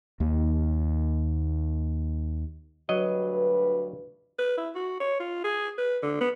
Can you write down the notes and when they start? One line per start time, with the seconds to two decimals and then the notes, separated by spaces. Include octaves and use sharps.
0.20 D#2 A#3
2.89 D2 G2 F#3 B4 D#5
4.39 B4
4.57 E4
4.75 F#4
5.00 C#5
5.20 F4
5.44 G#4
5.78 B4
6.03 D3
6.21 B3